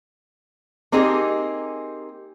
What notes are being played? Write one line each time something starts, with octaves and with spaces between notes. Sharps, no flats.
A#3 C4 D#4 G4 G#4